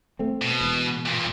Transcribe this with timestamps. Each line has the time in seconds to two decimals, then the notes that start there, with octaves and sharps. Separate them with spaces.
0.19 A3 C4
0.42 B2
0.61 E1
1.06 G2 A#2